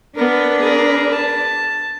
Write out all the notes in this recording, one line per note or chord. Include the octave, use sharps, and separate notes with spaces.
B3 D4 A#4 B4
G#4 A#4
A5